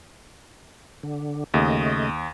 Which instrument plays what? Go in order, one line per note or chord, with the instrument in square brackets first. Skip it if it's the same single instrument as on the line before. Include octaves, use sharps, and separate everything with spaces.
[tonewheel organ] D3
[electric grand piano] D#2 [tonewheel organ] C#3 A3 D#5